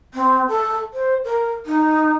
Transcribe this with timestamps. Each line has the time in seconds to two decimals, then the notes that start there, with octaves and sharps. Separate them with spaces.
0.14 C4
0.49 A4
0.94 C5
1.24 A#4
1.66 D#4